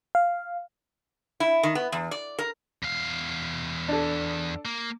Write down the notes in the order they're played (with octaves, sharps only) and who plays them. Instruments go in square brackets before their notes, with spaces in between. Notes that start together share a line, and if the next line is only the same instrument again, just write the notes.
[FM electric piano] F5
[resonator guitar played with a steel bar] E4
D#3
B3
E2
D5
A#4
[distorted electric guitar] E2 F5
[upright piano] D4 A4
[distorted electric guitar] A#3